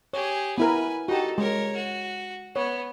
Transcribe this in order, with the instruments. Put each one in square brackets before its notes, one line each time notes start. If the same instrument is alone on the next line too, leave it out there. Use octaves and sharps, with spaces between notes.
[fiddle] G4 G#4 [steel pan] C#5
[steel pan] B3 E4 A#4 [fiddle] B4 G#5
[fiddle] D#4 A4 [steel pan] F#4 G4
[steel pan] G#3 [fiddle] A#4 C#5
[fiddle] F#4
[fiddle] B3 [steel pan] C#5